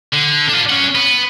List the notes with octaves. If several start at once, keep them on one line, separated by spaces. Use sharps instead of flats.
D3
D4 F4
C#4 F#5
B3